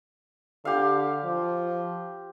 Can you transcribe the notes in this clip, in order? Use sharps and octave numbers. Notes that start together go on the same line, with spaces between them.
D3 G4 F5
F3